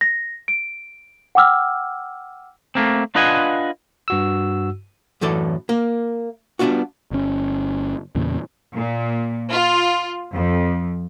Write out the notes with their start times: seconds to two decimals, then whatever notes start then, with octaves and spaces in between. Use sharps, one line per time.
0.01 A#6
0.48 D7
1.35 F#5 G5 D6 E6 F6
2.75 A3 A#3 C4
3.15 D4 F4 B4 D#5 F#5 G#5
4.08 G2 F#4 E6
5.21 F#2 A2 E3 A4 D5
5.69 A#3
6.59 G3 B3 C4 D4 F4 F#4
7.11 G1 C#4
8.15 E2 A#2 C#3
8.73 A#2
9.50 F4
10.34 F2